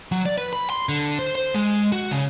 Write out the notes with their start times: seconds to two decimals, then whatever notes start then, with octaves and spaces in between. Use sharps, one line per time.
0.12 F#3
0.26 D5
0.38 B4
0.53 B5
0.70 C6
0.89 D3
1.19 C5
1.35 C5
1.54 G#3
1.92 F#4
2.11 C#3